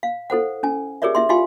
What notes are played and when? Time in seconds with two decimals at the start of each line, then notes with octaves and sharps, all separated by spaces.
0.03 F5
0.30 E4 A4 C5 F#5
0.63 C#4 G#5
1.02 G4 G#4 A#4 C#5 D5 E5
1.15 E4 E5 C6
1.29 E4 F4 G4 F5 G#5 C6